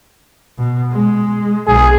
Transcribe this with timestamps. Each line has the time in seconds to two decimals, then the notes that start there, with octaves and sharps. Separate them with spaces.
0.58 B2
0.93 G#3
1.67 B1 B2 G#4